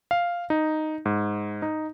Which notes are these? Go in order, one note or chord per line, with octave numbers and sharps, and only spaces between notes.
F5
D#4
G#2
D#4